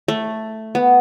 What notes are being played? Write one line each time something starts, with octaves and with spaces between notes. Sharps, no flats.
A3
B3